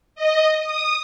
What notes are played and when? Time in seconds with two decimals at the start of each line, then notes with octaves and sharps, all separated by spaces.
0.15 D#5
0.60 D#6